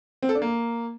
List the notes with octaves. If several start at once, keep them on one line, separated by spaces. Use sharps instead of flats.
C4
A4
D4
A#3